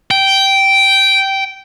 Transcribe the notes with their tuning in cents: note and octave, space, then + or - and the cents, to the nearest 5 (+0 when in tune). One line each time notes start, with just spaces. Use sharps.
G5 -10